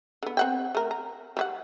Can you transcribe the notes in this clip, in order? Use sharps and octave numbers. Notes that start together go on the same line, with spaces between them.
D3 B3
C4 F#5 G5
A3 A#4
A#5
G3 G4 F#5